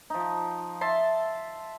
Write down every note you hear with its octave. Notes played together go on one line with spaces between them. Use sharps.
F3 D#4
E5 A5 C6